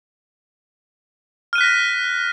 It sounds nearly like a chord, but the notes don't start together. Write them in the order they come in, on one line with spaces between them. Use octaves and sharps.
F6 D#7 F#6 B6 A#6